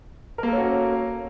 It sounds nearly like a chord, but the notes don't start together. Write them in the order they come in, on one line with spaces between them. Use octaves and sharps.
A#4 A#3 A4 C#4 F#4